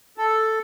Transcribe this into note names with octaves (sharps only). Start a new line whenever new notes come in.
A4